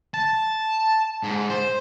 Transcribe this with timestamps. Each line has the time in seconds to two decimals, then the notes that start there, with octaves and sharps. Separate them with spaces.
0.14 A5
1.23 G#2
1.50 C5